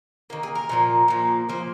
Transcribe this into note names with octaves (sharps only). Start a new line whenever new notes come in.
D#3 A#3
G#4
A#4
A#2 F3 A#3
A#2 F3 A#3
A#2 F3 A#3 C5